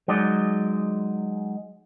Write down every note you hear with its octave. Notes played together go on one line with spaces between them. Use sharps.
F#3 G#3 D#4 D5